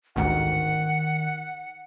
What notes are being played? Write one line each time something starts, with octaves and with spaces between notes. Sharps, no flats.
A1 D2 G#2 D#3 F#5